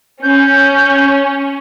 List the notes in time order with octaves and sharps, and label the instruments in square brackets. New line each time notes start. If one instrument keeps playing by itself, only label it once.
[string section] C#4 [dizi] G6